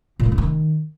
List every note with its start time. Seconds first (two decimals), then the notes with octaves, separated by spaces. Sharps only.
0.20 A#2
0.26 A3
0.32 F#2
0.38 D#3